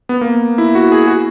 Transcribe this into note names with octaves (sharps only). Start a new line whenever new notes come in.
B3
A#3
E4
F#4
G#4
F#4